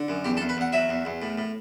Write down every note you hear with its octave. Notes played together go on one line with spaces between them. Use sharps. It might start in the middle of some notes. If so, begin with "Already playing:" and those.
Already playing: D3
F#2
E2 G4
A4
E2
B4
E2 F#5
F#3 E5
E2
E2
A2
A2